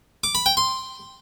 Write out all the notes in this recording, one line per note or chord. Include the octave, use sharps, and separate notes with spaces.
D6
B5
G5
C6